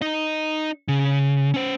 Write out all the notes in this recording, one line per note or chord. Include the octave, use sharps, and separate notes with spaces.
D#4 D#5
C#3
C#4 C5